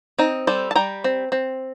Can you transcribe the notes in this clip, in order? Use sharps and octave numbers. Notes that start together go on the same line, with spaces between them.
C4 D#4
G3 A4 C5
A5
G3 G5 A#5
C4
C4